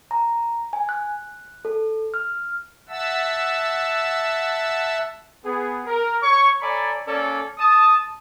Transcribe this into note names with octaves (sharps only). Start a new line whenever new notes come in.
A#5
G#5
F#6
A4
F6
E5 F#5 A5 E6
B3 G#4
A#4
C#5 C#6
A4 C#5 D5 G#5 A#5 B5
A#3 C#4 A4 D5
A5 D#6